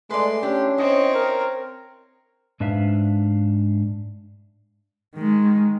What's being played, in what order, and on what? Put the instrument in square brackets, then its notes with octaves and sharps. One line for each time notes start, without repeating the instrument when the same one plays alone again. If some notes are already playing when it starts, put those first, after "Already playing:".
[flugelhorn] G#3 [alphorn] A3 [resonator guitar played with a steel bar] B4 D5 [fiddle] C6
[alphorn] C#4 [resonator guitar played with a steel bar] D4 E4 [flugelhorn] G4
[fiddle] C4 C#5 [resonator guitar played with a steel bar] E4 [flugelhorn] D#5
[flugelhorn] A#4
[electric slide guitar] G#2 D4 B4 E5 F5
[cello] D#3 G#3